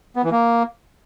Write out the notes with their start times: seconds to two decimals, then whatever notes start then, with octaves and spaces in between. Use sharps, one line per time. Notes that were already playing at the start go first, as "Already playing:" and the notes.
0.16 B3
0.24 E3
0.32 A#3